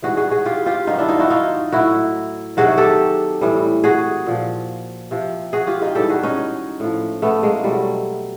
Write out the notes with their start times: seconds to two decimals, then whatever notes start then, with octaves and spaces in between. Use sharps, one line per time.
0.02 G#2 E3 G3 F#4 G#4
0.17 F#4 G#4
0.31 F#4 G#4
0.45 F4 G4
0.66 F4 G4
0.87 G2 D#3 F#3 D#4 F4
0.99 D4 E4
1.08 D#4 F4
1.19 E4 F#4
1.30 D#4 F4
1.72 A2 F#3 E4 F#4
2.57 C3 D#3 F#3 F#4 G#4
2.78 G4 A4
3.41 A2 E3 G3
3.84 F#4 G#4
4.27 A#2 F3
5.11 C3 F3
5.53 F#4 G#4
5.67 F4 G4
5.82 D#4 F4
5.95 G#2 E3 G3 G4 A4
6.09 F#4 G#4
6.23 C#4 D#4
6.80 A2 F3
7.22 A3 B3
7.43 G#3 A#3
7.64 B2 F#3 G3 A3